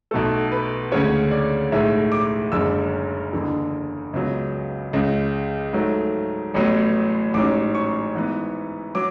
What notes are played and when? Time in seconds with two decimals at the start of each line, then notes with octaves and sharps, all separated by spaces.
0.11 B1 B2 A3 A4
0.52 B4
0.92 D2 C#3 G#3 C#4 C#5
1.31 D5
1.72 B1 A2 G#3 E5
2.12 D6
2.52 F#1 F#2 D3 G#3 C#4 E6
3.33 F#1 E2 D3
4.13 C#2 C#3 F#3 B3
4.93 C#2 C#3 G#3
5.73 G#2 F#3 A3
6.54 A1 A2 F#3 B3
7.34 A1 G#2 F#3 C#4 D6
7.75 C#6
8.15 G#2 E3 B3
8.95 F#3 D6